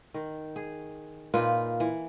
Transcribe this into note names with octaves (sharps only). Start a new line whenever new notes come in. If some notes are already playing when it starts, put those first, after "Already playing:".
D#3
G#4
A#2 D#4 F4 B4
E3